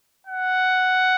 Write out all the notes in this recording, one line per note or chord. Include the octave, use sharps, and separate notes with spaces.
F#5